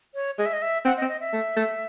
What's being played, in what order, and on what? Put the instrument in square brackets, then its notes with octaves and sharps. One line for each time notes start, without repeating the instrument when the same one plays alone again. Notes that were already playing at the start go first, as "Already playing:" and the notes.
[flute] C#5
[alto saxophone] G#3 [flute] D#5
[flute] E5
D#5
E5
[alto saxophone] C4 [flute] F#5
[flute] D#5
[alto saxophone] C4
[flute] D#5
E5
[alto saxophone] A3
A3